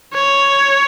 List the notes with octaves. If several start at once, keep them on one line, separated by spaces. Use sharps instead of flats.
C#5